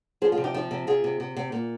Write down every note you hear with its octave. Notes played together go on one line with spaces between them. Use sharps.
F3 G#4 C5
F4 G#4
C3
D#4 G4
F3
C3
C3 F4 G#4
C3
C3
C3
A#2